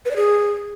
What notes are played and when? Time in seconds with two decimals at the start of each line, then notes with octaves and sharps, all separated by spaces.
0.05 B4
0.11 D5
0.16 G#4